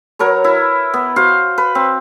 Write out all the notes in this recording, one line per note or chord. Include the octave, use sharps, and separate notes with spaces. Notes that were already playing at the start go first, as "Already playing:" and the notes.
F#3 A#4 B4 C#5
E4
B3
F#4 C5 F5
B4
C4